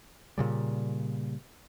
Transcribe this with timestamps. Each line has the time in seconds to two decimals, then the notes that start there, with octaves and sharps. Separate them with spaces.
0.38 A#2 C#3 G3